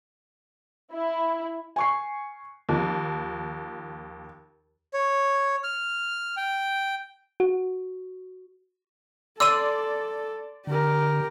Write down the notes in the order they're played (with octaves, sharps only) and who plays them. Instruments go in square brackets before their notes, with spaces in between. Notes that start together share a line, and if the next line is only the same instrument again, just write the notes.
[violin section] E4
[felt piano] G#5 C#6 C7
[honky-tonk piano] D#2 F3
[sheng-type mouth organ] C#5
F6
G5
[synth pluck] F#4
[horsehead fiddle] A4 [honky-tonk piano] D5 C6 [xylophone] E6 D#7
[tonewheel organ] D3 [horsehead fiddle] G4 A#4